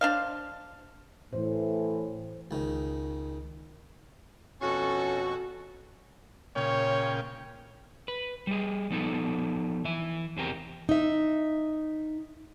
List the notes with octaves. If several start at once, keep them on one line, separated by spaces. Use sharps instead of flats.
D4 C5 F5
A2 E3 C5
C#2 D#3
F2 B2 C#4 F#4 A4 C#6
A#2 C#3 C#5 G5
B4
G3 G#4
F3 B3 D#4 A4
E3 E5
E2 C4 G4 A#4
D#4 E5